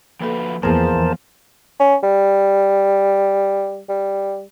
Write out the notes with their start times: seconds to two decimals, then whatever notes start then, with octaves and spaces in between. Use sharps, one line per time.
0.21 F3 A#3 F#4 A4 B4
0.63 E2 F3 A#3 B3 G#4 A#4 C5 A5
1.80 C#4
2.03 G3
3.89 G3